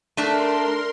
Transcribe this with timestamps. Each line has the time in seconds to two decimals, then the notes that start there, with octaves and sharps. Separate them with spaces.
0.17 A3 D4 A4 A#4 C6